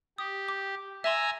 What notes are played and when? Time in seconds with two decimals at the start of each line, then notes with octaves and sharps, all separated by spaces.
0.18 G4 D#6
0.48 D6
1.04 E5 G#5 A#5 C6 E6